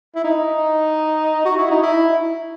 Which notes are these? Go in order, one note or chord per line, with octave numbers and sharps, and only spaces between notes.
E4
D#4
F#4
E4
D#4
E4